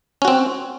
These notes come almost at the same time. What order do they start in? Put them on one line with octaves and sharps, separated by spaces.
C#4 F#4 C4